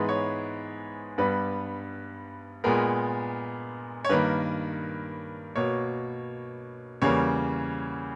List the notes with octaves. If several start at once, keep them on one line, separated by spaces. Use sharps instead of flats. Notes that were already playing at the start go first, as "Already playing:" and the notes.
Already playing: G#2 E3 G#3 B3 B4
C#5
G2 G3 B3 B4
A#2 G#3 B3 A#4
C#5
G2 D#3 A#3 B4
B2 A#3 C#5
E2 C#3 G3 A#3 C#5